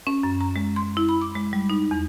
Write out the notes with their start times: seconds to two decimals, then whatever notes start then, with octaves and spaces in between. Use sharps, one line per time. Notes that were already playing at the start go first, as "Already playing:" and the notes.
0.07 C#4
0.23 F#2
0.41 A#5
0.56 G#3
0.76 C6
0.97 E4
1.09 B5
1.22 D6
1.35 G#3
1.53 G3
1.70 D#4
1.91 E2